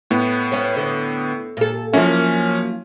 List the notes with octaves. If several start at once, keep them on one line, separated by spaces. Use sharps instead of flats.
A2 B3
C#4 C#5
D3
A#2 A4
F3 F#3 A#3 C#4 E4